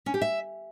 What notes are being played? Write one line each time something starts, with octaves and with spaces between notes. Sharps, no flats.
C#4
G4
E5